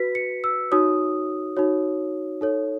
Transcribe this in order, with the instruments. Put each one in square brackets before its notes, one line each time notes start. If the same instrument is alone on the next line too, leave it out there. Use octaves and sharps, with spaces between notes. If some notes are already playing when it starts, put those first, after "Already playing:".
Already playing: [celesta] F#4 B4 B6
C#7
E6
D#4 F#4 C#5 D#6
D#4 F#4 C#5
D#4 A4 C#5